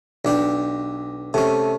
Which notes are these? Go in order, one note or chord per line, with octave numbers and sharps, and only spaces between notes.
B1 D4 G4
C3 A3 C#4